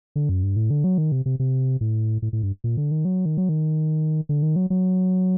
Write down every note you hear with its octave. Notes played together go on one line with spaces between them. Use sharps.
D3
F#2
G2
A2
D3
F#3
D#3
C3
C3
C3
A2
A2
A2
G2
A#2
D3
D#3
F#3
D#3
F#3
D#3
D3
D#3
F#3
F#3